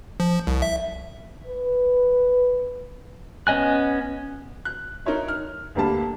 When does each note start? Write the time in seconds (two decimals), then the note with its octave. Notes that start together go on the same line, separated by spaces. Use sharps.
0.20 F3
0.47 C2
0.62 E5
1.47 B4
3.47 B3 C#4 D#5 G#5 F#6
4.65 F#6
5.06 D#4 A#4 C#5 E5
5.28 F6
5.75 D2 G3 A#3 G4 A5 B5